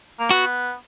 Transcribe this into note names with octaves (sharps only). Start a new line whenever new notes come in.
A#3
B3 F#4